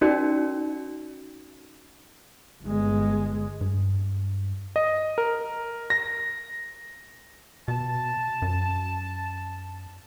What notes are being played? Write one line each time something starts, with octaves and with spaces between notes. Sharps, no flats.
C#4 D#4 F#4 A#4 D5 G5
G1 G#3
G2
D#5
A#4
A#6
B2 A5
F#2